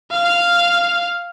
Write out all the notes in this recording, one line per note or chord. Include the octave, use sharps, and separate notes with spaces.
F5